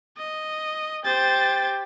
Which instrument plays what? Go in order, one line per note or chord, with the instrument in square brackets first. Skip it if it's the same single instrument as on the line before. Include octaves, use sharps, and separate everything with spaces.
[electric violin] D#5
[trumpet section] G4 G5 [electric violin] C5 A6